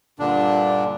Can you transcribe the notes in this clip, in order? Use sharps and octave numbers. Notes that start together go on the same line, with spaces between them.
G2 A#2 D3 D4